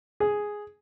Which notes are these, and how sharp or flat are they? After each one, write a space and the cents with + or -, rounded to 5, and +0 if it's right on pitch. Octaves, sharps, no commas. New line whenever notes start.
G#4 +0